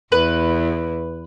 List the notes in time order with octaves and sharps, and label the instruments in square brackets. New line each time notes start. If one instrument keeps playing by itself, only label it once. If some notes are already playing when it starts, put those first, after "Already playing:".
[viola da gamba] E2 [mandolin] B4